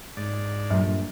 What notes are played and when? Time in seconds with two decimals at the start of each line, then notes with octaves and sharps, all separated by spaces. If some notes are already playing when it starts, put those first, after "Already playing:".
0.17 G#2 D5
0.71 G2 A#2 F#3